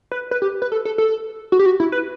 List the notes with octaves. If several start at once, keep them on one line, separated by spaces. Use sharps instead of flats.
B4
B4
G4
B4
A4
A4
A4
F#4
G4
F#4
E4
B4